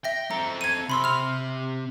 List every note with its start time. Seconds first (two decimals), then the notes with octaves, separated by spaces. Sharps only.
0.04 E5 G5 A#6
0.31 C4 A4 A#5
0.61 G#6 D#7
0.90 C3 B5 C6 E6
1.04 F6 F7